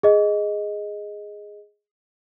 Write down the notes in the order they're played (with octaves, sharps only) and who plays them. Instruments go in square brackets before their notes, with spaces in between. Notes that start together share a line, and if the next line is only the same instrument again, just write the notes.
[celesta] G#4 D#5